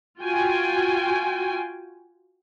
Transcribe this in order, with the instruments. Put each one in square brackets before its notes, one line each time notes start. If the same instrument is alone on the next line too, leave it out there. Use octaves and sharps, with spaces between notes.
[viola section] F4 F#4 G5 G#5